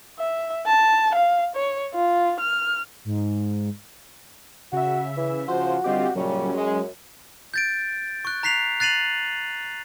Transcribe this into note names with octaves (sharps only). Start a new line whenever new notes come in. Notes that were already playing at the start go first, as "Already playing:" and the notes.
E5
A5
F5
C#5
F4
F6
G#2
C#3 F#4 E5
E3
C#3 F3 F4 F#4 C5
D3 G3 C4 F4 G4 D#5
F#2 A#2 C#3 F#3 G3 C#4
G#3
G6 A6 D7
C#6 F#6
A#5 F#6 B6 C7 F7
F#6 A6 C7 D#7 F7 F#7